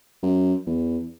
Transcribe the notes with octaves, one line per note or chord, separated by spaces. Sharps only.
F#2
E2